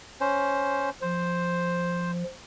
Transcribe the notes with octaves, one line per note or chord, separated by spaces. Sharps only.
C#4 C5
F3 C5